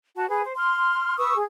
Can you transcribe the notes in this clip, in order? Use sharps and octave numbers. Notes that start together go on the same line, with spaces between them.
F#4 A5
G#4 B4
C5
C6 F6
B4 C#6 D#6 E6
G#4